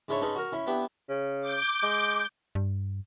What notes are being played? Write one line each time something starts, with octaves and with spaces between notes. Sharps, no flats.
G#2 D4 E4 A4 C#5
G#3 C#4 D#4 A4 B4
F#4 A#4
C#4 E4
B3 D4 E4 G4
C#3
D6 G6
G#3
G2